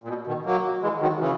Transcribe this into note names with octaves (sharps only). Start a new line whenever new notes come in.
A#2
B2
B2 D#3
F#3 A#3
E3 G#3
D#3 F#3
C#3 E3